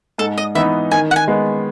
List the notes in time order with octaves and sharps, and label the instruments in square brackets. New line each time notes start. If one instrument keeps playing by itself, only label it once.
[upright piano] G#2 [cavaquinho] A4
[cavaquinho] D#5
[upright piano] E3 B3 D#4 [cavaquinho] E5
[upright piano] D#3 [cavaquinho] G#5
[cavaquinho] F#5
G#5
[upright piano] G#3 B3